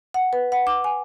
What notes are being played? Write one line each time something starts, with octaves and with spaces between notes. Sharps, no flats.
F#5
B4
F#5
D6
G#5